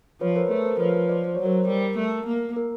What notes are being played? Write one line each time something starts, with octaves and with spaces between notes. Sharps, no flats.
F3 B4 C#5
A#4 C5
A3 A4 B4
A#4 C5
F3 B4 C#5
C5 D5
C5
F#3 C#5
A#4 C5
G3 A#4
A3
A#3
A#4